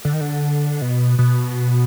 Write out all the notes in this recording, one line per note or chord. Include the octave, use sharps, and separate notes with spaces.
D3
D#3
D3
B2
B2